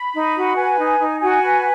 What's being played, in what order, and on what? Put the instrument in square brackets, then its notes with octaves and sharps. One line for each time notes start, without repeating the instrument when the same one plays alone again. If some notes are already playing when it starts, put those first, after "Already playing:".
Already playing: [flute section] B5
D#4
F#4
B4 G#5
D#4
D#4
F#4 G#5
B4